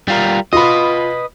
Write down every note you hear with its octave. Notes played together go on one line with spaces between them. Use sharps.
G3 F4 A#4
F4 B4 D#5 B5